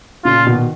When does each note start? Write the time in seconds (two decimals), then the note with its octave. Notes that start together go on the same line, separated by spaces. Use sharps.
0.25 A#2 C#3 F4
0.47 B2 D#3